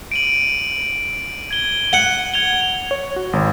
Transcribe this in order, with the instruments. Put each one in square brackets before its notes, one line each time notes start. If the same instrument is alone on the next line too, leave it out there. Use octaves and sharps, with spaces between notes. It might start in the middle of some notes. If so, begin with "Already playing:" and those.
[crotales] D7 D#7 F#7
G#6 G7
[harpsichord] F#5
[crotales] G#6 F7 G7
[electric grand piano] C#5
F#4
G#1